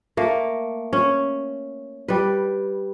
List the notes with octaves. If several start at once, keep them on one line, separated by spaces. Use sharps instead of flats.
A3 A#3
C#4
G3 B4